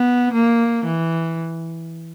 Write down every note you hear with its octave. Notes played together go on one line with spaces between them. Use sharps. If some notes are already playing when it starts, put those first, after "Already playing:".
Already playing: B3
A#3
E3